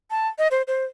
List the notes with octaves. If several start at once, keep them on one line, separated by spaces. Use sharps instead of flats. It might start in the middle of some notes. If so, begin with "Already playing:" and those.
A5
D#5
C5
C5